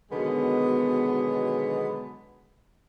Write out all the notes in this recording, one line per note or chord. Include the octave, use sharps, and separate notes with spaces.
B2 D3 D#3 F#3 G#3 B3